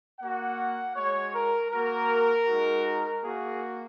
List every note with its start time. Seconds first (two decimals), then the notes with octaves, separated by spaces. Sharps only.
0.20 A#3 F#4 F#5
0.95 G#3 F#4 C#5
1.34 A#4
1.71 A#3 F#4 A#4
2.46 G#3 D#4 F#4
3.22 A#3 F#4 G#4